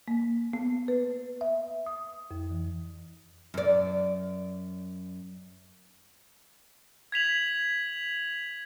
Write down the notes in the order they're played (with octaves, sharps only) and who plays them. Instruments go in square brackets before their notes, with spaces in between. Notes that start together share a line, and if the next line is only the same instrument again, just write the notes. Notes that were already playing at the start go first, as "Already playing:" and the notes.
[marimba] A#3
B3
B4
E5
D#6
F2
E3
[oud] F#2 D5
[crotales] G#6 B6 F7 F#7